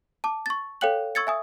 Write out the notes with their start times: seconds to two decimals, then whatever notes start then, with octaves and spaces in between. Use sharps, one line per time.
0.24 A5 D6
0.46 C#6 A6
0.81 A4 C#5 F5 G5 F#6 F#7
1.15 C#6 E6 G#6 A6 C#7
1.27 E5 G#5 D#6